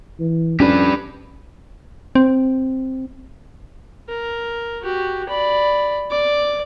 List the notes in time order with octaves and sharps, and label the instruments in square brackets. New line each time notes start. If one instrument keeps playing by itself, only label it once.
[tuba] E3
[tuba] F2 [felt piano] G3 D4 [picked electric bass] C#4 [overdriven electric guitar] G4 B4
[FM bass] C4
[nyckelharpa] A#4
F#4 G4
D5 B5
D5 D6